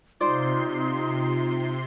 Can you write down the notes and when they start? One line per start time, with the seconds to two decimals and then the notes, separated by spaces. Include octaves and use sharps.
0.21 C3 D#4 F4 C5 D5 C6